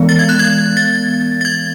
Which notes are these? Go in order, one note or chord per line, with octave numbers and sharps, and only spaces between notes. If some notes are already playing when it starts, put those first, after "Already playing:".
Already playing: E3 G#3 B3
A6
G#6
F#6
G#6
A6
A6
G#6